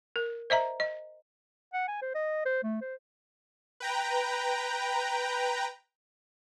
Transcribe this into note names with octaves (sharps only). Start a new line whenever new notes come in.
A#4
C5 D#5 E5 A#5
D#5
F#5
G#5
C5
D#5
C5
A3
C5
B4 G5 A#5